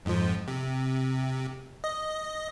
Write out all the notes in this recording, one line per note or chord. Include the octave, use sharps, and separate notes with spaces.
F2 G#2 F3
C3
D#5